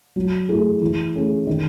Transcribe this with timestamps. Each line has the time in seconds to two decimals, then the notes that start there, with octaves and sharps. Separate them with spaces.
0.16 F#3
0.49 A3 E4 G#4
0.81 E3
1.15 A3 C#4 G#4
1.47 D#3